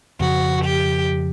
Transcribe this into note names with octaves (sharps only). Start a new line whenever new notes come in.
F2 C#3 F3 F#4
G4